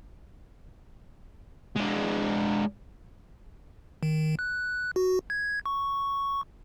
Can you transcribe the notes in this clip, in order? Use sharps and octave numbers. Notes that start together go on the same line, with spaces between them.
G#3 D4
D#3
F#6
F#4
G#6
C#6